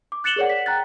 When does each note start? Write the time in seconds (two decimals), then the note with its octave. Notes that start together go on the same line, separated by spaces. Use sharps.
0.12 D6
0.24 F#6 A6 C#7 E7 F#7 G7
0.36 G#4 A#4 C#5 D5 F#5
0.49 B6
0.66 G5 A#5 F#6 A6